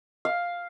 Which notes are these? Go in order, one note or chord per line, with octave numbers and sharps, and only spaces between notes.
F5